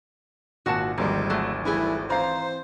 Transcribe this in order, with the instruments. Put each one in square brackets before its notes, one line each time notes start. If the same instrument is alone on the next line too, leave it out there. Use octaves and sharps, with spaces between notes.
[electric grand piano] G#1 A#2 C#7 [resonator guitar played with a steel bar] F#4 F#5 A5
[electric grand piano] G#1 D2 F3 [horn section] G3 G#3 [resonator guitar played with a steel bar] A#3
[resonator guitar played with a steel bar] F#3 A3
[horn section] E3 G3 A3 [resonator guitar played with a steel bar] E4 G#4
[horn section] E3 C4 C5 [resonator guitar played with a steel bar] F5 A#5